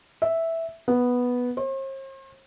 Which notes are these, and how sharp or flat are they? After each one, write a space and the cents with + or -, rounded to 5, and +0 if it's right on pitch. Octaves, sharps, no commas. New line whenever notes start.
E5 -5
B3 -5
C5 +45